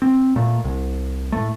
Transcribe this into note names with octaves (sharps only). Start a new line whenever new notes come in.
C4
A#2 A3
C2
A2 A3